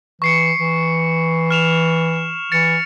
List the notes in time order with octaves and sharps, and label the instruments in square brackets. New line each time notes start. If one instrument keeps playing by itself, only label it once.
[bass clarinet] E3 [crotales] C#6 C7 C#7
[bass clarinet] E3
[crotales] F6 E7 F7
[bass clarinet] E3 [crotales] A6 C#7